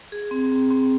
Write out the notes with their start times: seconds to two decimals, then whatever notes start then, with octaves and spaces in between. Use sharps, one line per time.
0.12 G#4
0.31 C4
0.52 C4
0.71 C4